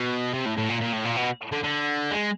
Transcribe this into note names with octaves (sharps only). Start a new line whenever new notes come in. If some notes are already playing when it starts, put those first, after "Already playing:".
Already playing: B2
C3
A2
A2
A#2
A#2
A2
A#2
B2
D3
D3
G#3